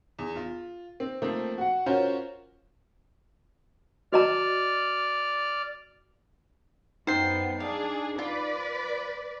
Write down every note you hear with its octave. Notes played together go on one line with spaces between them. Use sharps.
E2
F4
C4
F3 A3 A#3 C4
F#4 F#5
C#4 F4 F#4 A#4 C5 C#5
F#4 D5 D#5 A#5 F6
F#2 B3 D#4 C5 G5 C7
D4 G#4 F5
F4 B4 D5